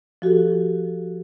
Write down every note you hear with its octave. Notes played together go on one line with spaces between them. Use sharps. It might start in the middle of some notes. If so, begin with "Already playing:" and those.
F3 F#4 G4 A4